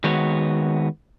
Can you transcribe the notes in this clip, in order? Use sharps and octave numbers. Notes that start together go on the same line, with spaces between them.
D#3 G#3 B3 F#4 C#5